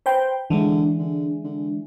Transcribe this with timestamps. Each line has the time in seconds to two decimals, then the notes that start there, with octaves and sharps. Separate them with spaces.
0.06 B4 C5 G5
0.50 D3 E3 G#3
0.99 D3
1.44 D3